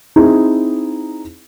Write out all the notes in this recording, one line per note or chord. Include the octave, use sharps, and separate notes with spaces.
C4 D#4 E4 G#4